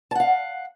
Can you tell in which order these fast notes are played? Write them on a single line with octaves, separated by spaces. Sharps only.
A5 F#5 F5